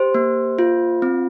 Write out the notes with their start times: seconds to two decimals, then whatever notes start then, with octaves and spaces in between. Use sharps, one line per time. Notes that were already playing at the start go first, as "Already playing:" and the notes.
Already playing: G4 C5
0.14 A#3
0.59 F4
1.02 C4